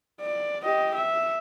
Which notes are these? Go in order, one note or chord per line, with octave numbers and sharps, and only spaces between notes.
D5
G4 D#5
E5